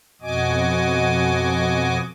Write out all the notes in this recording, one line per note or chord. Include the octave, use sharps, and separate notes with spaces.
F2 B2 F#4 D#5 G#5 D6